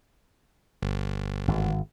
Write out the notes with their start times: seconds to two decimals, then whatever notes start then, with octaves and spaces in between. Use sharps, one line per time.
0.82 G1
1.48 G#1